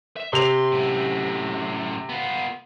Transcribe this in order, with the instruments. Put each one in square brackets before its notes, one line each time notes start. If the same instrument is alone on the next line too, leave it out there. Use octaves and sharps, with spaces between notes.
[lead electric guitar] E5
[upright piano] C3 F7 [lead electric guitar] C6
[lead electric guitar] F#2 A2
B3 F4